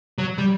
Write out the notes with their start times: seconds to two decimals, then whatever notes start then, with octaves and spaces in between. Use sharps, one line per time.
0.18 F#3
0.38 G3